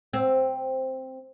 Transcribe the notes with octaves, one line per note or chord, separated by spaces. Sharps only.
C4